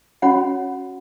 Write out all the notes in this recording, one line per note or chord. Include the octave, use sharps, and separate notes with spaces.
C#4 F#4 C#5 F#5 B5